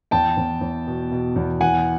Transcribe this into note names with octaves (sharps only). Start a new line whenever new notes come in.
E2 G5 A5
E2
E2
B2
B2
E2
E3 F#5 G#5